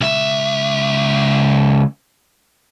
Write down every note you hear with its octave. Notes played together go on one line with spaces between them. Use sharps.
C#2 E5